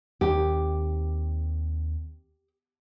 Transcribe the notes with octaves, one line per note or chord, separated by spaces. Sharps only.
D#2 D#3 C4 G4